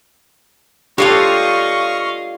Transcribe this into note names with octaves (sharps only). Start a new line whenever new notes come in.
D4 F4 G4 A4 C#5 D#5 F5 C#6